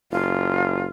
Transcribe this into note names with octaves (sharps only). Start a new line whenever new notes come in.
F#1 F4